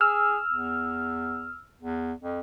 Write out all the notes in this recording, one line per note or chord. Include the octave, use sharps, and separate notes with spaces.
G#4 E6 F6
E2
E2
F2